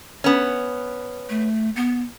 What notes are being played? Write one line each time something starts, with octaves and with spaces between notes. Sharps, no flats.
B3 C#4
A3
B3